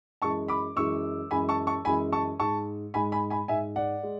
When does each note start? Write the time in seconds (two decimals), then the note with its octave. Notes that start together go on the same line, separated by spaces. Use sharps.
0.22 F#2 E3 G#3 A5 C#6
0.48 B5 D6
0.76 F#2 E3 G#3 C#6 E6
1.31 F#2 E3 G#3 G#5 B5
1.49 A5 C#6
1.67 A5 C#6
1.85 F#2 E3 G#3 G#5 B5
2.12 A5 C#6
2.40 G#2 G#3 A5 C#6
2.94 G#2 G#3 G#5 B5
3.12 G#5 B5
3.30 G#5 B5
3.48 G#2 G#3 E5 G#5
3.76 D5 F#5
4.03 G#3